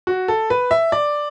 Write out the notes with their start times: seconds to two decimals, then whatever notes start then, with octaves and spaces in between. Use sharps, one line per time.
0.07 F#4
0.28 A4
0.50 B4
0.71 E5
0.92 D5